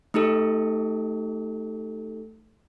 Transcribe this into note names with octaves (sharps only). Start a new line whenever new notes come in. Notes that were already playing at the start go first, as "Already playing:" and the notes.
A3 D#4 G4 A4